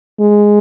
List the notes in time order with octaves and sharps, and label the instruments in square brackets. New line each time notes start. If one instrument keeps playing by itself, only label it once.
[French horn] G#3